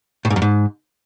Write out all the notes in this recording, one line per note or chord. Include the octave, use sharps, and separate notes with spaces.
A2
G#2
F#2
G#2